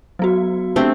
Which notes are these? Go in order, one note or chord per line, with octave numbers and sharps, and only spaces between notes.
F#3 B3 F#4
A3 B3 C4 D4 G4